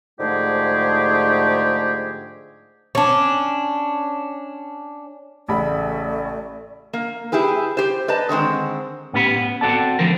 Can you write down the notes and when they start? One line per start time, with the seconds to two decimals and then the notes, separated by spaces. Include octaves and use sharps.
0.18 G#2 D3 F3 A3 G4 G#4
2.95 C#4 D4
5.48 A1 C#3 A3 D5 B5
6.93 A#3
7.32 E4 G4 G#4 B4
7.77 G4 C5
8.08 B4 D5 D#5 A5
8.29 D3 D#3 G#3 C4
9.13 A2 B3 C#4 G4 B5
9.37 B3
9.61 C4 F#4 A4 D5 A5
9.99 D3 F3 A3 C4 A#4